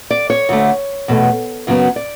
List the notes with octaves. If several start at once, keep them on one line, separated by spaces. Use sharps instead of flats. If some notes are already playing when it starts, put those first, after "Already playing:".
D5
C#5
D2 D3 A3
E2 B2 A3
F#2 C#3 F#3 B3
D5